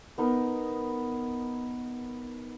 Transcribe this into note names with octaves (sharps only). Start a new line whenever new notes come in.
B3 D#4 A#4